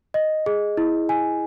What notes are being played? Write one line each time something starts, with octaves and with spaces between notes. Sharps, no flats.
D#5
G#4
E4
G#5